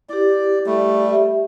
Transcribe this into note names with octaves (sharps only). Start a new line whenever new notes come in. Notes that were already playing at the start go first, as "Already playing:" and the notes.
E4 G4 D5
G3 A3
G4 E5